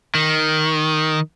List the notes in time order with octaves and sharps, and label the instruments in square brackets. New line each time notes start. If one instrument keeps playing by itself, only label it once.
[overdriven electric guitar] D#3